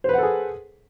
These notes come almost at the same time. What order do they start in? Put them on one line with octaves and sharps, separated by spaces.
C5 B4 F#5 A4 G#4